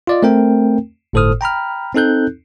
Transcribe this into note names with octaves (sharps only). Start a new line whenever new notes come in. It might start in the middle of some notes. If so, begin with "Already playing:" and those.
F4 D5 D#5
A3 C4 A#4 G5
G1 A2 A4 C5 D#6 F6
G5 A#5 B5 F6
C4 D#4 A4 F#6 G6